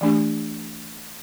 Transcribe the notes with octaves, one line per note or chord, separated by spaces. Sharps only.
E3 A3 D4 G4